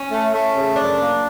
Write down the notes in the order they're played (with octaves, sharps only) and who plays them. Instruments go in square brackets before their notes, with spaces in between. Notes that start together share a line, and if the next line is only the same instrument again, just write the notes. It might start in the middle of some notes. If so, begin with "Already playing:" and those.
Already playing: [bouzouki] C#4
[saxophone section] A3
A3
C#3
[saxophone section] F#2 [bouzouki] D4
[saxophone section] A#3